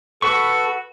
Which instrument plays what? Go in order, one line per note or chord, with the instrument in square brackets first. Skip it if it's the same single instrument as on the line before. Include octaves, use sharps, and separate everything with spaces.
[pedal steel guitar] F#4 B4 C#6 [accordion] A4